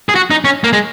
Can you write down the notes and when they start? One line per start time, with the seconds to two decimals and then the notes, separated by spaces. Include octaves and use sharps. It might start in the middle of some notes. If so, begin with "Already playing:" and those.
0.09 G#4
0.15 F#4
0.31 D#4
0.44 C#4
0.64 A#3
0.73 G#3